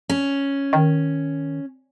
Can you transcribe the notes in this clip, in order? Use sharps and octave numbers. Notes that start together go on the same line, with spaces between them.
C#4
D#3